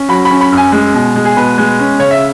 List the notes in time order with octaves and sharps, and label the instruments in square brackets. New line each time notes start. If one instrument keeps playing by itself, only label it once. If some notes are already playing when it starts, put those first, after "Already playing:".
Already playing: [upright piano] C#4
F#3 B5
B5
C#4
B5
F#2
G#5
G#3
B2
G#3
G#4
B2 B4
G#3
C#4
C#3 C#5
E5